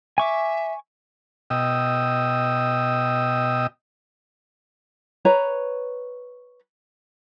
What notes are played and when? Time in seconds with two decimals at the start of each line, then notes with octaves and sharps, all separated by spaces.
0.18 E5 G#5 C#6 D6
1.50 B2 D#5 G5 D#6 E6
5.25 B4 C#5 A#5